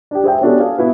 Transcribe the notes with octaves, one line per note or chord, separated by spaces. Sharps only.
D4 G4
G#4 C5 E5 G5
B3 C#4 D4 F#4 G4 A4
G#4 F5
B3 E4 F#4 B4